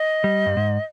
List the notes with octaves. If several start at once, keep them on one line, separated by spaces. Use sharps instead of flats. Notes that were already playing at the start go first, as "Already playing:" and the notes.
Already playing: D#5
G3
G2
G#2